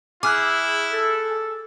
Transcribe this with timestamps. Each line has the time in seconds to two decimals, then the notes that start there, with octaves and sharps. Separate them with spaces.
0.23 E4 G#4 D6 F6 F#6
0.91 A4